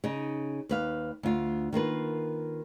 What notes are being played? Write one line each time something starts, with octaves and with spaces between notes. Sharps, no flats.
C#3 D#4
D#2 B4 F5
D2 F4
D#3 A#3 F4 B4